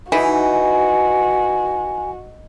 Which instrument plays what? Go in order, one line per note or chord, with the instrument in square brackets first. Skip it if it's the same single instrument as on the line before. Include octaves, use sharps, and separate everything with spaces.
[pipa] E3 [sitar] D#4 [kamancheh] F#4 [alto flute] G#5